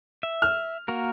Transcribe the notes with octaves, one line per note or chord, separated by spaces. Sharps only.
E5
F6
A#3 F#4 A#4